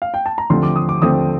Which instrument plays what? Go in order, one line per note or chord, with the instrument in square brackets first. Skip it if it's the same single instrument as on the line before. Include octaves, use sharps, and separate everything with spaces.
[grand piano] F5
G5
A5
A#5
D#2 D3 F3 A3 C4 C6
D6
D#6
D6
D#2 D3 F3 A3 C4 D#6